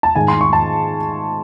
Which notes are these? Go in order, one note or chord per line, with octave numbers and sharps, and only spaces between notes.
A5
G#2 D#3 G#5
C6
C#6
A5